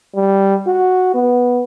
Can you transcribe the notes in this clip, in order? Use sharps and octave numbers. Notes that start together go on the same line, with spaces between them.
G3
F#4
B3